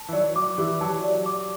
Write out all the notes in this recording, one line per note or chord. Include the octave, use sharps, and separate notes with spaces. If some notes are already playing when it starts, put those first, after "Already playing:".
Already playing: A5
E3
F#3 D5
D6
E3 G4
F#3 A5
D5
D6